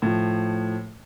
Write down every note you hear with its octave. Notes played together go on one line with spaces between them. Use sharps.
A2 F3